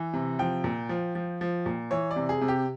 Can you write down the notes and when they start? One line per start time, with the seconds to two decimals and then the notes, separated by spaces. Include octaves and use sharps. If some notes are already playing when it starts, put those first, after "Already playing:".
Already playing: E3
0.13 C3
0.39 F3 G5
0.64 A#2
0.89 F3
1.15 F3
1.41 F3
1.66 A#2
1.91 E3 C#5
2.11 D5
2.16 C3
2.29 G#4
2.41 C3
2.48 G4